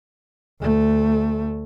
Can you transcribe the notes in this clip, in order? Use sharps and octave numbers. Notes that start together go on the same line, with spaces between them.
D2 A3